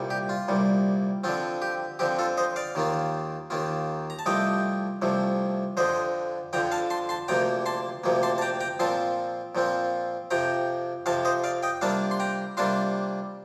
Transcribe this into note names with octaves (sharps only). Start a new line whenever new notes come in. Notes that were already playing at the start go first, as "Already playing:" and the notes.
Already playing: C2 A#2 G3
G4
F4
C2 A#2 G3
D3 F3 C4 F4
G4
D3 F3 C4 G4
F4 A4
C5 D#5
D5 F5
D#2 D#3 A#3 F4
D#2 D#3 A#3 F4
A#5
A5
C2 C3 F3 A3 D#5 G5
C2 C3 F3 A3
F2 D3 F3 C5 D#5
F2 D3 F3 G5 A#5
F5 A5
A5 C6
A5 C6
D2 C3 F3 A#3 G5 A#5
A5 C6
D2 C3 F3 A#3
A5 C6
A5
G5 A#5
G5 A#5
A#2 F3 C4 F4 A5 C6
A#2 F3 C4 F4
F2 C3 F3 G5 A#5
F2 C3 F3 F5 A5
C5 D#5
D5 F5
D#5 G5
C3 G3 A#3 D4 F4 F5 A5
C6
G5 A#5
C3 G3 A#3 D4 F4 A5 C6